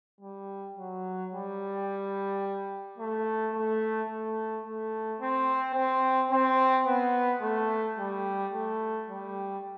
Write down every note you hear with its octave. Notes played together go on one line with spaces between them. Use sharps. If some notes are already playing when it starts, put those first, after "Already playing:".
G3
F#3
G3
A3
A3
A3
A3
C4
C4
C4
B3
A3
G3
A3
G3